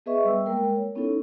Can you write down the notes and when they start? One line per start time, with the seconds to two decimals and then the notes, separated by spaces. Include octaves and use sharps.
0.06 B3 G#4 B4 D#5 E5 C#6
0.25 G3 E6
0.46 G#3 A#3 A#4 G5
0.77 C#5
0.95 B3 C#4 D#4 E4 A4